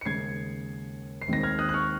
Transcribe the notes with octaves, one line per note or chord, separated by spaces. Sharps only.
C#7
D#2 C#3 G#3 G#6 C7
C7
D#2 D#3 G#3 C4 A#6
F6 G#6
D#6 F#6
F#6
C#6 F6